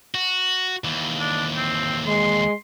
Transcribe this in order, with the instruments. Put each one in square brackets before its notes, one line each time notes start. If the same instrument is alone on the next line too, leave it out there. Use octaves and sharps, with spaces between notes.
[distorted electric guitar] F#4
D#2 E3
[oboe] D4
C4
[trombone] G#3 [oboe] C6